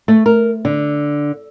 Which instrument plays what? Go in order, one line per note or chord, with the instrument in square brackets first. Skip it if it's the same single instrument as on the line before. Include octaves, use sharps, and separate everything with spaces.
[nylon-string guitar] A3
A#4
D3